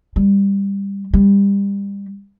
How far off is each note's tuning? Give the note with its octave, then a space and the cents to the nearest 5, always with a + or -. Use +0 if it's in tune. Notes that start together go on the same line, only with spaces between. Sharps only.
G3 +15
G3 +25